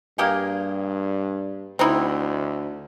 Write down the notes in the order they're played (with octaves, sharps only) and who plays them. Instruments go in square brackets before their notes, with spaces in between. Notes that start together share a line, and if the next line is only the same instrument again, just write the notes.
[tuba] G2 [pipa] A#3 G4 G#4
[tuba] D2 [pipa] C4 D#4 E4